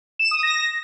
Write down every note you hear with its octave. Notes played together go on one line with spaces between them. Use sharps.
E7
D#6
A#6